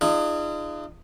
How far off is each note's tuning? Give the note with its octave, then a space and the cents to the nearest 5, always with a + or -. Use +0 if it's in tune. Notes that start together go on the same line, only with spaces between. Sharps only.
D4 +45 F4 -40 G#4 +0